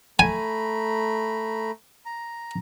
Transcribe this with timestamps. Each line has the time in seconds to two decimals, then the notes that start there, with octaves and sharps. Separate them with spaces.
0.19 A3 G#5 A#5 B5
2.06 A#5